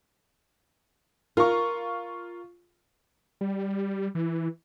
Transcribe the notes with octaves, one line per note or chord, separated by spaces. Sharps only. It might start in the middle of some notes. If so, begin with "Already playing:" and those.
F4 A#4 C#6
G3
E3